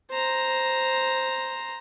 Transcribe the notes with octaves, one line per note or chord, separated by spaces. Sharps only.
C5 A#5